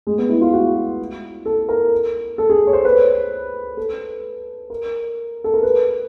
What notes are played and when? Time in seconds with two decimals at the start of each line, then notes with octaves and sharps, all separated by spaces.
0.07 G#3
0.18 B3
0.29 E4
0.41 F4
0.53 F#4
1.46 A4
1.69 A#4
2.38 A4
2.50 G#4
2.67 C#5
2.73 C5
2.85 B4
3.77 A4
4.70 A#4
5.44 A4
5.54 A#4
5.63 B4